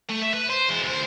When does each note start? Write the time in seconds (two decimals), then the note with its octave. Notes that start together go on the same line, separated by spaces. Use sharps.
0.10 A3
0.22 E5
0.34 B4
0.50 C5
0.69 E2 G#3
0.83 D2 C5